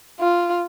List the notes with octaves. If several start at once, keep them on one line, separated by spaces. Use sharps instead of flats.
F4